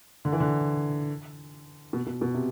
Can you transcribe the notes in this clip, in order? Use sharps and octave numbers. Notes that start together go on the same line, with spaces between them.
D3
E3
D3
B2
B2
B2
C3